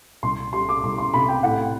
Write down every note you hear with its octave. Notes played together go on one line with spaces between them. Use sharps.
C2 C6
G3 C6
D6
C2 C6
C6
C3 B5
G5
A2 F#5